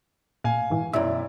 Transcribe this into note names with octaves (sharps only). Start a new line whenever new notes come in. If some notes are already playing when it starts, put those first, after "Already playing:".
A#2 F5 G#5
G#2 E3
B1 F#2 E4 D5 E5